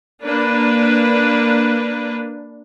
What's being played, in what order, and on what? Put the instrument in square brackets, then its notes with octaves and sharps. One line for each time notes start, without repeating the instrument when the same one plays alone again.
[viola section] A#3 D4 B4